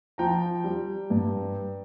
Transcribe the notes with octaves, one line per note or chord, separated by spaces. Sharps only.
F3 G5 A#5
G3
G2